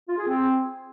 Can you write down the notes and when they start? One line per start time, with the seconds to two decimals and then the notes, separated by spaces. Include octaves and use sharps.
0.08 F4
0.18 G#4
0.28 C4